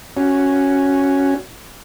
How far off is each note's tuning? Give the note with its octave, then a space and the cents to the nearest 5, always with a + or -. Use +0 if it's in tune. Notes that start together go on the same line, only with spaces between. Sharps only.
C#4 +0 F#4 +0